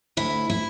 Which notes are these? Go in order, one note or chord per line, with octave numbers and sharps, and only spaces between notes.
D2 E4
E4